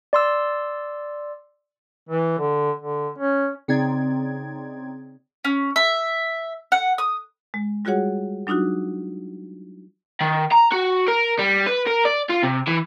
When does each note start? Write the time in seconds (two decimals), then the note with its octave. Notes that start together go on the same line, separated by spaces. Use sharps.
0.13 D5 C6 E6
2.09 E3
2.39 D3
2.80 D3
3.19 C#4
3.68 C#3 C4 D#4 D5 G#6
5.44 C#4
5.76 E5
6.72 F#5
6.98 D#6
7.54 G#3
7.85 G3 F4 F#4 G#4 C#5 F#5
8.47 F#3 D4 D#4 F4 F#4
10.21 D#3
10.52 A#5
10.72 F#4
11.08 A#4
11.39 G3
11.66 B4
11.87 A#4
12.05 D5
12.30 F4
12.43 C3
12.68 E3